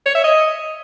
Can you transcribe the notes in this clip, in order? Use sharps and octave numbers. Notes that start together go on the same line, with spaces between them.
C#5
E5
D#5